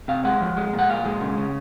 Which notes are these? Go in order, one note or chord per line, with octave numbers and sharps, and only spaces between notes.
C3 F5
G#3 F#5
F3
G#3
A#2
F#5
A#2 F5
G#3
C#3
C#3